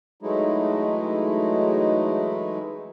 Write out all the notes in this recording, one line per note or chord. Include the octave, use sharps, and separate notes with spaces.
E3 F#3 G#3 A3 D#4 E4